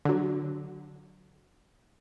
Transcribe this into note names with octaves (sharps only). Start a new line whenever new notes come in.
D3 F#3